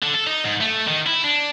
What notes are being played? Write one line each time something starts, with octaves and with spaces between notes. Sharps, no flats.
D3
A4
D#4
G#2
A3
D#3
E4
D4